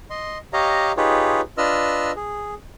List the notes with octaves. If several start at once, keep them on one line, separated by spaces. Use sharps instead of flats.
D#5 C6
G4 C#5 D#5 F5 A#5
D#4 F4 G4 G#4 B4 C#5
D4 F4 B4 D#5 E6 F6
G#4